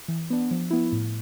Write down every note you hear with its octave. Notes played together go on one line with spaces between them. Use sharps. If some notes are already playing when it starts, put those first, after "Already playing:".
E3
B3 D4
F3
B3 E4
A2